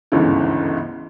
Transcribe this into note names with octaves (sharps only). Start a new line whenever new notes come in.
G1 D2 G#2 C#3 E3